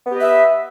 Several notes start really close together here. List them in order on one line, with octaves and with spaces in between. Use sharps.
B3 G4 D#5 B4 E5